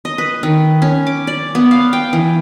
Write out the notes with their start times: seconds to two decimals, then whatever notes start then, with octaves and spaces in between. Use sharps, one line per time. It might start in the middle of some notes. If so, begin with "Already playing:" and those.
0.05 D#5
0.18 B4
0.43 D#3
0.82 C#4
1.07 D6
1.27 D5
1.55 B3
1.71 F5
1.93 G5
2.13 E3